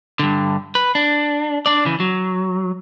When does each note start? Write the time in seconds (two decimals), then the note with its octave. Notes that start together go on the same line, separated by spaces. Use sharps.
0.19 G2 D3
0.75 B4
0.95 D4
1.66 D4 D5
1.85 C#3 E3
2.00 F#3